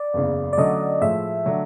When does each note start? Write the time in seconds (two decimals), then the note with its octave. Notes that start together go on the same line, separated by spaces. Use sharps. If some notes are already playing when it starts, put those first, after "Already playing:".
Already playing: D5
0.13 F#1 E2 C#3
0.53 D5
0.58 D3 F#3 A3 C#4 D#5
1.01 A2 F3 G#3 E5
1.46 D3 F#3 A3 D4